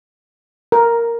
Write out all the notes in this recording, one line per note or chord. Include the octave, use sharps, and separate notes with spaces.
A#4